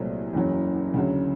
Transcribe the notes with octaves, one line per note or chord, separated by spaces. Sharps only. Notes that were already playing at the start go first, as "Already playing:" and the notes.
Already playing: C2 A#2 F#3 A3 C4
F#1 E2 C#3 F#3
D2 C#3 F#3